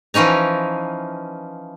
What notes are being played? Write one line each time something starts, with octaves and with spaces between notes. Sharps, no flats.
E3 F3 C#4 D#4 A#5